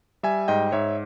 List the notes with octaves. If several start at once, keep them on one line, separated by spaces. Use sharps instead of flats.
G3 E5 G#5
G#2 D#5 G5
G#2 C#5 E5